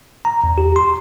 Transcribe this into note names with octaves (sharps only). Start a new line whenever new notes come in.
A#5
E2
G4
C6